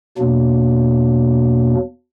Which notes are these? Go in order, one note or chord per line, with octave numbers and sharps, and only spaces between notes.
E2 B2 F#3 A#3 D4